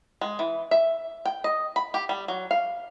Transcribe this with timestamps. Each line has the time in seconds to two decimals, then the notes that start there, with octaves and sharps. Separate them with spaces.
0.21 G#3
0.39 E3
0.71 E5
1.25 G5
1.44 D#5
1.76 B5
1.94 G4
2.09 G3
2.28 F#3
2.51 F5